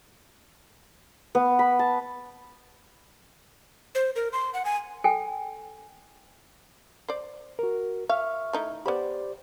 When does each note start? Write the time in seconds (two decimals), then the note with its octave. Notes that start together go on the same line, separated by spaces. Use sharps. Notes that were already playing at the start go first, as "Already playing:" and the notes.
1.35 B3
1.59 B5
1.79 A5
3.95 C5
4.16 A#4
4.33 C6
4.54 F#5
4.65 G#5
5.04 A4 G5 G#5
7.09 C5 D5
7.59 F#4 A#4
8.09 E5 F5 C#6 F6
8.53 A3 D#4 E4
8.86 B3 G4 C5 D5 B5